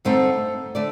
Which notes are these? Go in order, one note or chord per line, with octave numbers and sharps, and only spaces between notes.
G2 D3 A3 C4 D#4 C5
D3 A3 D5